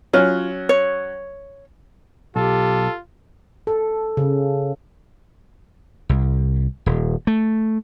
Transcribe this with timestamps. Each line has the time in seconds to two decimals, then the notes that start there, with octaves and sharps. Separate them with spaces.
0.13 F#3 C#4 F4
0.69 C#5
2.36 B1 F4 G4 A4
3.67 A4
4.17 C#3
6.09 C2
6.86 D#1
7.27 A3